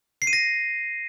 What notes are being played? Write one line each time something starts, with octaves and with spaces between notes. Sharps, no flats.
C7
D#7
A#6